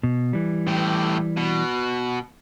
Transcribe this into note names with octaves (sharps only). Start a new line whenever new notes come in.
B2
E3 G3
A2 G4
B2